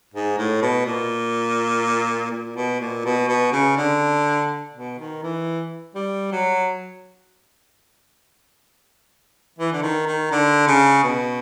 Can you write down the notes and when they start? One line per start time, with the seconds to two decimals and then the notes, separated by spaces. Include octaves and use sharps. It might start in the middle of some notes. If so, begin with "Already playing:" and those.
0.14 G#2
0.38 A2
0.62 B2
0.86 A#2
2.31 A#2
2.56 B2
2.81 A#2
3.05 B2
3.28 B2
3.52 C#3
3.77 D3
4.74 B2
4.99 D#3
5.22 E3
5.95 G3
6.32 F#3
9.59 E3
9.73 D3
9.82 D#3
10.07 D#3
10.31 D3
10.67 C#3
11.03 B2